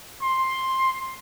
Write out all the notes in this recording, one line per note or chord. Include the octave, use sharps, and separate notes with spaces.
C6